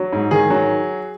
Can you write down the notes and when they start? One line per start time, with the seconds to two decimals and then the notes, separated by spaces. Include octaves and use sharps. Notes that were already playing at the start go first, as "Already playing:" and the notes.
Already playing: F#3
0.13 G#2
0.31 D#3 G#4
0.50 F#3